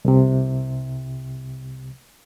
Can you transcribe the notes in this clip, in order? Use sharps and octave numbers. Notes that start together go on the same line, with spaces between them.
C2 C3